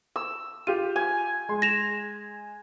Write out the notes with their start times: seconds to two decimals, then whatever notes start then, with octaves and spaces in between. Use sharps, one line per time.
0.16 E6
0.67 F4 G4 D#7
0.96 G#5
1.49 G#3 C6
1.62 A#6 E7 F7